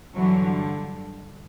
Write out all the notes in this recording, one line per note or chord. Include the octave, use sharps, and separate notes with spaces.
G2 D3 E3 F#3